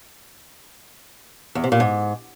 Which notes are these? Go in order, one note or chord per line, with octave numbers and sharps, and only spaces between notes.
E2
C3
A#2
G#2